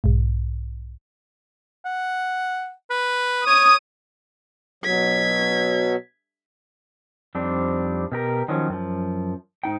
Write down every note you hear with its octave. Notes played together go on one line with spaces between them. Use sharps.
B1 G#2
F#5
B4
C#5 D#6
B2 F#3 G#6 B6
F2 G3 C4 D4 D#4
B2 G4 A#4
D#3 F3 F#3 C#4
F#2 F3
G#2 D#4 G5